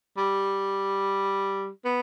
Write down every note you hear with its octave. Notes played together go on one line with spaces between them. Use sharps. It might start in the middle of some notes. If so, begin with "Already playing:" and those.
G3
B3